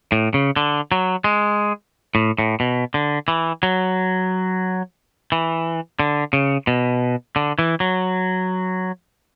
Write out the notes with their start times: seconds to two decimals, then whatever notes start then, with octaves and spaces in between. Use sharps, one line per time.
0.12 A2
0.34 C#3
0.56 D3
0.92 F#3
1.24 G#3
2.15 A2
2.39 A2
2.60 B2
2.94 D3
3.28 E3
3.63 F#3
5.32 E3
6.00 D3
6.33 C#3
6.67 B2
7.36 D3
7.59 E3
7.80 F#3